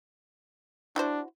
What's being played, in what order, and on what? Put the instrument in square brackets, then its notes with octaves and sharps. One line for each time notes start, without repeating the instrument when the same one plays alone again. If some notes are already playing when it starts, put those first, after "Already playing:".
[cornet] D4 [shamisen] E4 F#4 C5